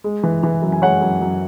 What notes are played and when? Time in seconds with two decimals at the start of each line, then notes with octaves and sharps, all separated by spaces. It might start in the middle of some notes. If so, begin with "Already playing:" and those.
0.04 G#3
0.23 E3
0.43 E3
0.62 F#2
0.72 G#5
0.82 G#3 C#5 F#5
1.01 F#2
1.21 F#2